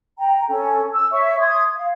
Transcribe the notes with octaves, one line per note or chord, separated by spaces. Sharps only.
G5 A#5
C#4 A4
E6
C#5 E5 C#6
C6 D#6 G#6
F5